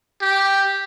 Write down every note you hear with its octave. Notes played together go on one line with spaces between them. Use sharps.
G4